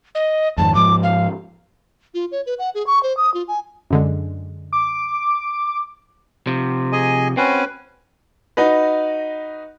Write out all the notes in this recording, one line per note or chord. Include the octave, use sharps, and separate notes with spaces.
D#5
F2 G#2 D#3 A5
G#2 F3 D6
F5
F4
C#5
B4
F#5
G#4
C#6
C5
D#6
F4
G#5
F#2 D3 G#3
D6
C3 F3
G#4 D#5 G#5
C4 C#4 F#4 B4 G#5
D#4 F#4 B4